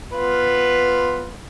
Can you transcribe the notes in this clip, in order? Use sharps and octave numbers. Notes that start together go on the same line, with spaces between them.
B3 F4 B4